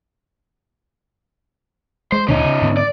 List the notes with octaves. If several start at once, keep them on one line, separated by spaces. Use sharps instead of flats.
G#3 C5
D2 A#2 D3 C#4 D#4
C#3
G#2 D3 B3
D5